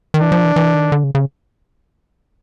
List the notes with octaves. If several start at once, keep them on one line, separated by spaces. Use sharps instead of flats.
D#3
E3 D4
F3
E3
E3
D#3
D3
C#3
C#3